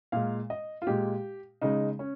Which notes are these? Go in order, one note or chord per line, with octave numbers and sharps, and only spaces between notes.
A#2 G#3 F5
D#5
F4
A#2 G#3 G4
C#3 G#3 D#4
C#4